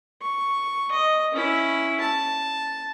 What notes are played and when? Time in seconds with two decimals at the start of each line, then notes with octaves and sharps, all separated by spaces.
0.21 C#6
0.91 D#5
1.33 C#4 E4
2.00 A5